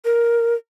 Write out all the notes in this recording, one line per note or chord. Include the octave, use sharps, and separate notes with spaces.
A#4